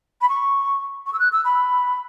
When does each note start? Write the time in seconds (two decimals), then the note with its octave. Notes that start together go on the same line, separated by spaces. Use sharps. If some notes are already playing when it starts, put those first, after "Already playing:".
0.21 B5
0.28 C#6
1.06 C#6
1.13 E6
1.19 F#6
1.32 E6
1.44 B5